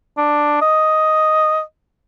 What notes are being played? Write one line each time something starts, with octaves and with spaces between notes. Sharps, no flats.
D4
D#5